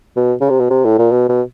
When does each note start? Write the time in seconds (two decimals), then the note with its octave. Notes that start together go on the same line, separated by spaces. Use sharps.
0.17 B2
0.41 C#3
0.50 C3
0.60 B2
0.70 C3
0.85 A2
0.98 A#2
1.11 B2
1.29 B2